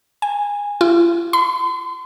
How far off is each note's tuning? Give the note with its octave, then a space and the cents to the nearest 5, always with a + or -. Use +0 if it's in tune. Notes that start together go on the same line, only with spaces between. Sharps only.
G#5 -20
F4 -45
C6 -40